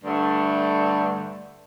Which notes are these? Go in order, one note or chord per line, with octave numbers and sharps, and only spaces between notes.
G2 D3 A3